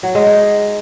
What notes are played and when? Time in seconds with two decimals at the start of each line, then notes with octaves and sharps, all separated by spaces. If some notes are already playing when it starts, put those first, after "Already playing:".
0.03 F#3
0.15 G#3
0.27 D#4